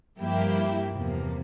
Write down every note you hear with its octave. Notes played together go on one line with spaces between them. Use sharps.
G2 F3 A#3 E4 G4
E2 C3 F3 A#3